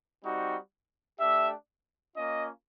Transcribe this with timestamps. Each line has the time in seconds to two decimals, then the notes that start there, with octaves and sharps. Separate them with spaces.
0.24 G3 C4 D#4 F#4
1.19 A3 D4 G4 E5
2.16 A#3 C#4 F4 D#5